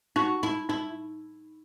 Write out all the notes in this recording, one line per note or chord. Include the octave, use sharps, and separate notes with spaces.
D#4 F#4
D#4 E4
D#4 E4